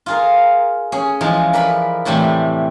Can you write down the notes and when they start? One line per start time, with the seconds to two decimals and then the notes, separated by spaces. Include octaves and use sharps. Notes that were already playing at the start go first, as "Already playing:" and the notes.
0.06 F4 G#4 A#4
0.92 C#4 G#4
1.21 E3 F3 G#3
1.53 A#4 B4 D5 B5
2.05 A2 C3 E3 G3 A3